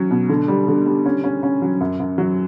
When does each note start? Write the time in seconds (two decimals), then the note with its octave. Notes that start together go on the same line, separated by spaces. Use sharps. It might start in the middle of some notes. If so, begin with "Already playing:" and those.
Already playing: F#3 C#4
0.11 B2
0.29 D3
0.48 G3
0.68 D3
0.86 G3
1.06 C#4
1.24 C#4
1.43 C#4
1.62 F#3
1.81 F#2
2.00 F#2
2.18 F#3